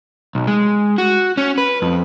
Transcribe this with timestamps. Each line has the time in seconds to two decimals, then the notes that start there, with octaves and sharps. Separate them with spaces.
0.35 B1
0.47 G#3
0.98 F#4
1.37 C#4
1.58 B4
1.82 F2